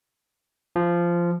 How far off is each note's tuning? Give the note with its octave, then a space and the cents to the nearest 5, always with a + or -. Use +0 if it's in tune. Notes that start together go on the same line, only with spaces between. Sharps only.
F3 -15